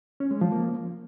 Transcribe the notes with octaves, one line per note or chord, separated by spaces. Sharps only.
C#4
G#3
F3
A#3